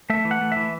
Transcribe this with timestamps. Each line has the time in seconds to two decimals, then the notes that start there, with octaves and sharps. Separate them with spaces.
0.10 A3 E5
0.25 E3
0.31 F#5
0.41 A3
0.52 E3 E5